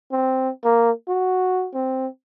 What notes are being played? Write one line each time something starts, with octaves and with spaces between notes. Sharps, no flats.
C4
A#3
F#4
C4